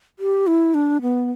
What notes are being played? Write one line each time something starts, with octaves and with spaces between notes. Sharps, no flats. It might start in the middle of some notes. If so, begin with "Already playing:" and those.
G4
E4
D4
B3